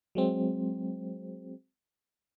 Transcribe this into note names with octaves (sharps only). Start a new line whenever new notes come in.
F#3 G#3 C4